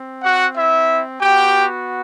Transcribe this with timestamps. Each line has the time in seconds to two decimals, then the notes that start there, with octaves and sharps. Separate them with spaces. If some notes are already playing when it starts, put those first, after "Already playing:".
Already playing: C4
0.23 F#4 F#5
0.56 E4 E5
1.20 B3 F#4 G4 G5